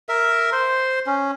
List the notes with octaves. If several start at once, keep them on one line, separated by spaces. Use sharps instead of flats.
A#4 E5
C5 C6
C#4